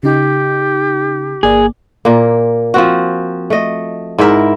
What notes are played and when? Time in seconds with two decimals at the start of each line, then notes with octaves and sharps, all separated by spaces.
0.03 C#3 D#4 G4
1.43 G1 A#3 G#4 D5
2.05 A#2 A#3
2.74 F3 C4 F#4
3.50 A3 D#5
4.18 G#2 E4 A#4 E5